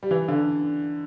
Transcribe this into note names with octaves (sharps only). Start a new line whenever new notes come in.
G3
E3
D3